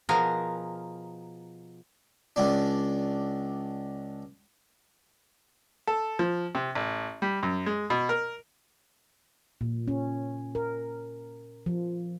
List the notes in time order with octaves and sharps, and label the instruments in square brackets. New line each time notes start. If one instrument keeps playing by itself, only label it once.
[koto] B2 F3 G#4 A#4
[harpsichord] C#2 D4
[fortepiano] A4
F3
C3
A1
G3
F#2
G#3
B2
A#4
[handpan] A#2
C#4
A#4
F3